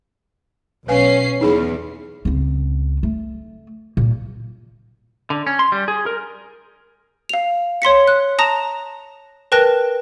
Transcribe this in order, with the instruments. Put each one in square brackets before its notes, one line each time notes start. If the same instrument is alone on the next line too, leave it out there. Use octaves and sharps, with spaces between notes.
[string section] B1 C#4 C7 [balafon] B4 F5 G#5
[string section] E2 [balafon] D#4 G#4 B5
[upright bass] C#2 C4
A3
A#2
[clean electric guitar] D3
C#4
C6
G3
G#4
A#4
[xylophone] F5 F7
C#5 C6 B6 C#7
F#6
A5 A#5 D#6 A#6 E7 F7
A#4 B4 G5 A5 F#6 A#6